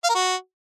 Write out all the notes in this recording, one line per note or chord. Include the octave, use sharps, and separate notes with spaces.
F5
A#4
F#4